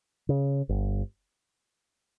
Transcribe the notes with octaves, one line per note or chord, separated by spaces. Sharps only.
C#3
G1